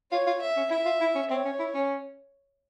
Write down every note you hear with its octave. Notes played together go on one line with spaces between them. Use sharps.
F4 C#5
F4
E5
C#4
E4 E5
F4
E4
C#4
C4 C#5
C#4
E4
C#4